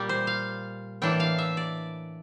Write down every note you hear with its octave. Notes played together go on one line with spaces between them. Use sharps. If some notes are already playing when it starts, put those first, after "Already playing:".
Already playing: A#2 G3 A#3 G4
C5
F5
A2 E3 A#3 D4 G5
F5
E5
D5